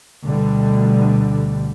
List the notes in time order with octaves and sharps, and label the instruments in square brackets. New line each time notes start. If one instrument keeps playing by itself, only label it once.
[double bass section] D2 B2 D3 G3